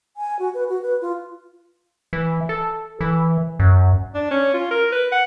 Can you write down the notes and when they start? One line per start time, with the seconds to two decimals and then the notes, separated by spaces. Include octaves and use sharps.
0.17 G#5
0.39 F#4
0.54 B4
0.69 F#4
0.82 B4
1.02 F4
2.13 E3
2.49 A4
3.01 E3
3.59 F#2
4.15 D4
4.31 C#4
4.54 F4
4.71 A#4
4.92 B4
5.12 F#5